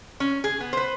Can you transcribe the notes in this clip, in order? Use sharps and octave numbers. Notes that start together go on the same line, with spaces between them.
C#4
G#4
B3
B4 C5